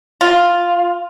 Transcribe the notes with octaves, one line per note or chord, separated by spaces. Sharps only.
F4